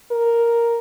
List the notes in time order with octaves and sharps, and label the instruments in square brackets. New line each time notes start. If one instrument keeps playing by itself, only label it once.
[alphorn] A#4